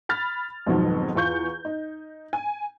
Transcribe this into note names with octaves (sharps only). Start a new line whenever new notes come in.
B5 F6 A6
F2 G#2 B2 D#3 F3 F#3
E2 F4 C#6 G6
D#4
G#5